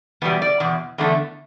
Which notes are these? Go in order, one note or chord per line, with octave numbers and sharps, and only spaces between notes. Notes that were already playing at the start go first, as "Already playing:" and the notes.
E2 B2 G3 B3
D5
E2 B2
E2 D3 A3